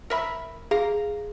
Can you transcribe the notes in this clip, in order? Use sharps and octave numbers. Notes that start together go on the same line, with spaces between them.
A#4 E5 B5
G#4 F5 A#5